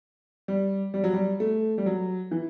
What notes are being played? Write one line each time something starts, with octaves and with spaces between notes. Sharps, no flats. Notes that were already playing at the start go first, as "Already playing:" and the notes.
G3
G3
F#3
G3
A3
G3
F#3
E3